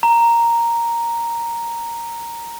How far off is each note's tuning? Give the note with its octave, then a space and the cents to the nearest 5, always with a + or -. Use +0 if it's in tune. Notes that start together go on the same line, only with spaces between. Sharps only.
A#5 +0